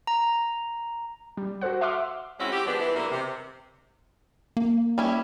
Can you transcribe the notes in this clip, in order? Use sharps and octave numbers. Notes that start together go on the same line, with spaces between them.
A#5
G3
F#4 G4 A4 C5 F#5
E5 F#5 C6 D6 F6
G#3 C4 C#4 E4 F#4 E5
G4
F3 G#3 B3 D4
E3
B2 D3 E3 G3 A#3
C3
A#3
G3 C#4 E4